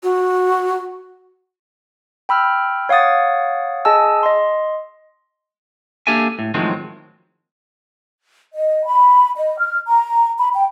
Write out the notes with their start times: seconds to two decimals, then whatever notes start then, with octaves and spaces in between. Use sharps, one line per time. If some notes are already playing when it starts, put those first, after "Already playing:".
0.03 F#4
2.29 G5 B5 E6 F6
2.89 C#5 F5 F#5 D#6 A6
3.85 G#4 D#5 G#5 A5 E6
4.23 D#5 C6
6.07 A#3 D4 G4 A4 E5 G#5
6.39 A2
6.54 A2 D#3 F3 F#3 G#3 C4
8.54 D#5
8.86 B5
9.36 D#5
9.59 F6
9.87 A#5
10.38 B5
10.54 G5